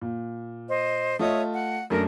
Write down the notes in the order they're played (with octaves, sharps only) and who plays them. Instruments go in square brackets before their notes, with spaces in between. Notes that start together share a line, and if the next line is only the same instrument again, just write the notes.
[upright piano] A#2
[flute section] C5 D#5
[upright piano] A3 F4 D#5 [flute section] C#5 E5 D#6
[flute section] F#5
[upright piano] F#2 A3 D4 [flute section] A#4